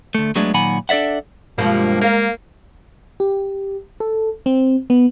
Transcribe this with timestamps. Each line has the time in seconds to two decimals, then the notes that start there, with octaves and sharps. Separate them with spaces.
0.15 D2 A3
0.35 F#3 G#3 A3 B3 D4
0.54 A#2 D#3 F#3 F#5 G#5 B5
0.89 D4 A4 D5 E5 F#5
1.58 G2 B2 F3 G#3 A#3
2.01 A#3 A#4 F5
3.20 G4
4.00 A4
4.46 C4
4.90 B3